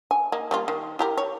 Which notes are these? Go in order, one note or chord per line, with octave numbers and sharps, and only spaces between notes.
G#5
A#3 D#4
G3 A#3 F4
D#3
E4 G4 A#4
C#5